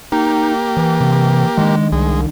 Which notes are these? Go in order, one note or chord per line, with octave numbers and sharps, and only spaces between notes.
A#3 D#4 G4
E3
C3
D#3 G#3 D4
C2 G#3